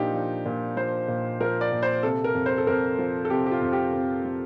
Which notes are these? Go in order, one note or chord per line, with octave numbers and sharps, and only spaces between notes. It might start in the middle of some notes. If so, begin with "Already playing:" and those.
Already playing: A#2 F3 D4 D#4 G4
F3
A#2
F3 C5
A#2
F3 A#4
D5
A#2
C5
C3 A4
A#4
F2
C5
A4
F2 A#4
F3
A4
C3 G4
G4
F4
F2
G4
F2
F3